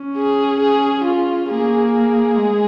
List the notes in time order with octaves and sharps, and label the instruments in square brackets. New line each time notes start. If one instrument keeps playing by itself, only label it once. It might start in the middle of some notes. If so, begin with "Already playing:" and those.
Already playing: [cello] C#4
[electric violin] G#4
G#4
F4
[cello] A#3 [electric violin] G#4
[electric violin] G#4
[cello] G#3